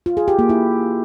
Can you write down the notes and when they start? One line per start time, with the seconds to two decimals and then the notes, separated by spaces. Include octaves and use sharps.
0.06 F4
0.17 G#4
0.28 G4
0.39 A#3
0.49 E4